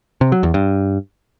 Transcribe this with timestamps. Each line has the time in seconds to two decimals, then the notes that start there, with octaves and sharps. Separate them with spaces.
0.21 C3
0.32 F#3
0.43 E2
0.54 G2